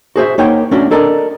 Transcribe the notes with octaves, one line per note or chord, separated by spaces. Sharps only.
F#4 G#4 C5 E5
A#3 D#4 C#5 F#5 G5
A3 C#4 D4 F#4
D4 A4 A#4 D5 D#5